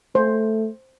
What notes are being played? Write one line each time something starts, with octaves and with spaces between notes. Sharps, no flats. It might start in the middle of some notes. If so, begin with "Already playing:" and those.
A3 C5